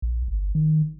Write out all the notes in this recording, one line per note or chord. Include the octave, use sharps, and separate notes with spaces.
A#1
G1
D#3